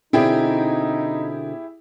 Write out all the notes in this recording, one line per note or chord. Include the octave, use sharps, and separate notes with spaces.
B2 D3 C4 D#4 E4 G4 G#4